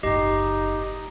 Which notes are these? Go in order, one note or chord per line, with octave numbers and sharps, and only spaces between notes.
F#1 A2 D#4 G4 D#5